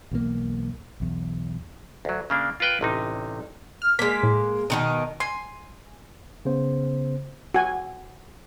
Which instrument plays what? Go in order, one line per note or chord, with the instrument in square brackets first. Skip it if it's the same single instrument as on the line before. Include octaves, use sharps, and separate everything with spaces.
[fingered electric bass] B1 E2 F3 A#3
B1 E2
[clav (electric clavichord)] D2 F#3
C#3 A#3 D4
F4 A#4 B4 G5
A1 C3 D#4
[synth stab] F6
[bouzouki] G#3 A#3 [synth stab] B6
[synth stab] A2
[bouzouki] B2 D#3 D#4
[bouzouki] G#5 [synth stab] C6
[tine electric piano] C#3 B3 C5
[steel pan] F#4 G#5